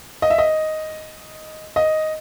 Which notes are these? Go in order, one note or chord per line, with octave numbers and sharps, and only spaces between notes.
D#5
E5
D#5
D#5